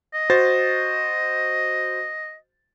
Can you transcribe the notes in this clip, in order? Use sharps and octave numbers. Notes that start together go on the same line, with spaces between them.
D#5
F#4 C5 A6